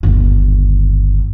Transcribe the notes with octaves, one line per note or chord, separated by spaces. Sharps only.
G1 D#2